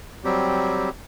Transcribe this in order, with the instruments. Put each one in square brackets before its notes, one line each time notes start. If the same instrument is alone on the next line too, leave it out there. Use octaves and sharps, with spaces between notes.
[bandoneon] F#3 G3 C4 G4